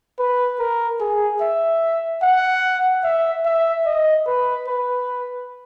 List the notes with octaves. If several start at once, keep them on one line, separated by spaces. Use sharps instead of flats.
B4
A#4
G#4
E5
F#5
E5
E5
D#5
B4
B4